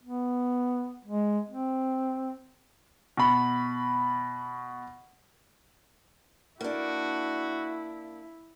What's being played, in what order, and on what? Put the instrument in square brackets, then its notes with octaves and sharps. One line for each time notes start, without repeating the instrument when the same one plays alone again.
[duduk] B3
G#3
C4
[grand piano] B2 B5
[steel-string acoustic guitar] A#3 D4 [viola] E4 [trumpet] F#4